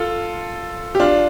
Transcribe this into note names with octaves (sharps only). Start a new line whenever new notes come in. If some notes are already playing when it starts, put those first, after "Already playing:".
Already playing: F4 A4
G4
D4 F4